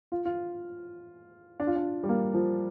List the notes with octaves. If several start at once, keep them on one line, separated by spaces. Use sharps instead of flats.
F4
F4
D4
F4
D4
G3
A#3
F3